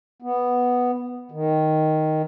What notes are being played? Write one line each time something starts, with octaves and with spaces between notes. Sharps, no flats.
B3
D#3